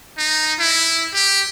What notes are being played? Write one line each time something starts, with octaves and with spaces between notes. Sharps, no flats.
D#4
E4
G4